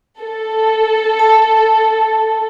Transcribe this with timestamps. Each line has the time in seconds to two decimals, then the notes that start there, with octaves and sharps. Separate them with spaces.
0.20 A4
1.19 A5